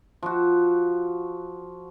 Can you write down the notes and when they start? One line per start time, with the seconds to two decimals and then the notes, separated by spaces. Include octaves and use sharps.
0.22 F3 F#4